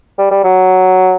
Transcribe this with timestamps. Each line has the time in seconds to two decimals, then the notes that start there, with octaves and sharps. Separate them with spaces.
0.18 G3
0.31 G3
0.44 F#3